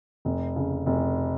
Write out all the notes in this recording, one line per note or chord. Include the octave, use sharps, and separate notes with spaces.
F1
C#3
F1